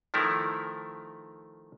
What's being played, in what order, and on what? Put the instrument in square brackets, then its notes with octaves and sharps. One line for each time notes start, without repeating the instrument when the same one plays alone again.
[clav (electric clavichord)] D#3 F3 A3 E4 A#4